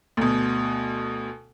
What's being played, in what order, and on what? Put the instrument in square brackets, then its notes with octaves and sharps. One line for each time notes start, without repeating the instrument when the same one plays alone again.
[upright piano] D2 B2